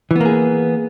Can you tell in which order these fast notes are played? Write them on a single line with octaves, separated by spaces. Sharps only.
E3 B3 A#3 G#4